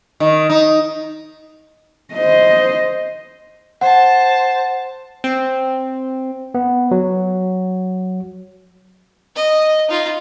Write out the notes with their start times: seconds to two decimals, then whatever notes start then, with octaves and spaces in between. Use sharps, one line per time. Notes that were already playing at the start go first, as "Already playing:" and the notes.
0.20 D#3
0.50 D#4
2.14 C5 D#5
3.81 C5 F#5 A5
5.24 C4
6.55 B3
6.91 F#3
9.36 D#5
9.89 D#4 F4